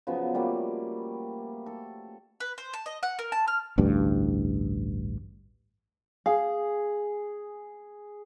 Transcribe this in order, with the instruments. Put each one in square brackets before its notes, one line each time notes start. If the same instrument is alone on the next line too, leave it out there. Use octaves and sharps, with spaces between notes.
[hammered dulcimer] C#3 F3 F#3 B3
G3 A3 A#3
A4
[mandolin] B4
C5
A5
D#5
F#5
A#4
A5
F6
[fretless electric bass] A1 D2 G2
[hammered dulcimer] G#4 [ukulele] F5